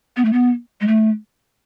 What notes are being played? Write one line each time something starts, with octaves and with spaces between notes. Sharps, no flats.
B3
A3
B3
G#3
A3